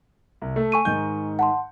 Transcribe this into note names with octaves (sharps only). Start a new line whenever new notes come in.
C2
A3 A4
G#5 C#6 D#7
G#2 D#3 G6
F#5 A5 C6